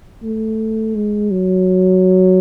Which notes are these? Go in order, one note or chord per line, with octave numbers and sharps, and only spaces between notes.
A3
G#3
F#3